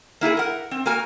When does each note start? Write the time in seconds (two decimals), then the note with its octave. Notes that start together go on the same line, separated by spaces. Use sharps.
0.21 A#3 E4 G4 G#4
0.37 A#4 F#5
0.71 C4
0.86 A#3 F#4 A#4 G#5